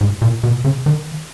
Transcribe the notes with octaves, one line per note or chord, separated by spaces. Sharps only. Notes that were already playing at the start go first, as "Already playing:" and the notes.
G#2
A#2
B2
C#3
D#3